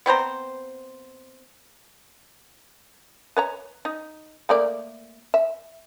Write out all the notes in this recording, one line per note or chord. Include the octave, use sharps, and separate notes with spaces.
B3 C4 C5 A#5
B4 C#5 A#5
D#4
A3 A#3 D5
E5